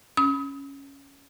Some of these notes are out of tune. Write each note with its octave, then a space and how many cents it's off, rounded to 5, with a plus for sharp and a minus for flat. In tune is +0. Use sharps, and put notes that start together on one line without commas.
C#4 +0 D#6 +40